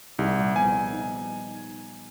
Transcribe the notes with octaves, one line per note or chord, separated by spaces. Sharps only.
C2 D#4 G4 G#4
A#2 G3
D#3 F3 B3 G#5
D#4